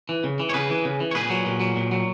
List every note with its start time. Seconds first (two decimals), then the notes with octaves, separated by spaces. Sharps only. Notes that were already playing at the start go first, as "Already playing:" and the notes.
0.09 E3
0.24 C#3
0.40 E3
0.49 C#5
0.54 C#3 G#4 B4
0.70 E3
0.85 C#3
1.00 E3
1.11 C#5
1.15 A#2 G#4 B4
1.30 F#3
1.46 A#2
1.60 F#3
1.77 A#2
1.92 F#3